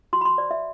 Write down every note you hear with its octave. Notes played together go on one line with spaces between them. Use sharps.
F#4 C6
B5
C6
C5 D5
E5